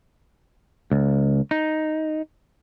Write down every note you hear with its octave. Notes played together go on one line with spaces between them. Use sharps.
C#2
D#4